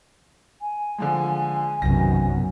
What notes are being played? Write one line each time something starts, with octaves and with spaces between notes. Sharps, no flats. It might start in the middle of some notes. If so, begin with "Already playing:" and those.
G#5
D3 F3 G#3
B1 F#2 C3 D#3 B3 A#6